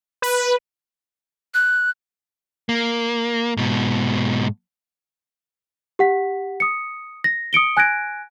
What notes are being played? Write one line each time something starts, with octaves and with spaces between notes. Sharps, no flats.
B4
F#6
A#3
G#2 B2
G4 F#5 B6
D#6 C#7
A#6
D#6 C#7 D7 G7
G#5 F#6 G#6 A#6 D7